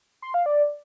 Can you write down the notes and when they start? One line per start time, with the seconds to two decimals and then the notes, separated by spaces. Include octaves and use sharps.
0.22 C6
0.34 F5
0.46 D5